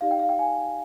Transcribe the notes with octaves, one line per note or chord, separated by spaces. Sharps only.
D#4 G4 D5 F5
G5
F5
G5
G#5